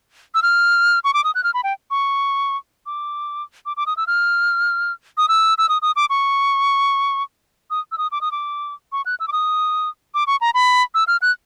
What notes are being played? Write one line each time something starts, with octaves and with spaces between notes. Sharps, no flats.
E6
F6
C#6
D6
D#6
F#6
F6
B5
G5
C#6
D6
D6
D6
D#6
E6
F6
D#6
E6
E6
D#6
D#6
D6
C#6
D#6
E6
D#6
D6
D#6
D6
C#6
F#6
E6
D6
D#6
D6
C#6
A#5
B5
E6
F6
F#6